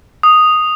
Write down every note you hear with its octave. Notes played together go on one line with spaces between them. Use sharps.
D#6